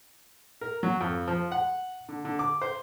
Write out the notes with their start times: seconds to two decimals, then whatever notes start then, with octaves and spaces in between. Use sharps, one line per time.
0.61 A#4
0.83 F#3
1.01 F2
1.28 F3
1.52 F#5
2.09 D3
2.25 D3
2.39 D6
2.62 C5